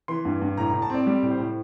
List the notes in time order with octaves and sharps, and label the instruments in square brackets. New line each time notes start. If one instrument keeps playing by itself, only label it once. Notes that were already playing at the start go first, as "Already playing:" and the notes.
[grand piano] E3 C6
G2
G2
A2 A#5
A2 A#5
A5
C4 D5
G3 D5
A2
C5
A2